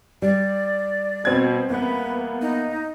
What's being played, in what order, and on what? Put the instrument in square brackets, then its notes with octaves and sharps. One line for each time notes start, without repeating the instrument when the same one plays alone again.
[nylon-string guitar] G3 [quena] D5
[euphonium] B2 [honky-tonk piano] C4 G#6
[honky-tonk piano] E2 B3 [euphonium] A#3 [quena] B4
[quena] D#4